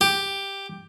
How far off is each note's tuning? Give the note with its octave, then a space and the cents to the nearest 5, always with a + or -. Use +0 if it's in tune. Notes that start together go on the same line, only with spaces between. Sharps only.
G4 +5